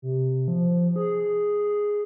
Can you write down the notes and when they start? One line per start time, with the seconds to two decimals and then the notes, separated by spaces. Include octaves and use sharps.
0.02 C3
0.48 F3
0.96 G#4